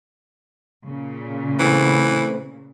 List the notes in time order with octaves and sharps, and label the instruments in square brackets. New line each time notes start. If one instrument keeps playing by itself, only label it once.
[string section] A#2 C#3
[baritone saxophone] E3 [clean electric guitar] A3 C4 B4